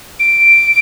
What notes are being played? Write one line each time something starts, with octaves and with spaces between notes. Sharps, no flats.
D7